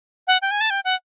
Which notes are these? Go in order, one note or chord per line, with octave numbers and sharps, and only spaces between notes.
F#5
G5
G#5
A5
G5
F#5